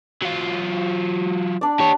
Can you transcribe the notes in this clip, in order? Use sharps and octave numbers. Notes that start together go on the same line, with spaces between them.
F#3 F4
D4 D5
G4 C#5